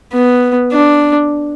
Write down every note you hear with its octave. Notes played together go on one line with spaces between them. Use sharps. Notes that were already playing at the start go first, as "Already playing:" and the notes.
B3
D4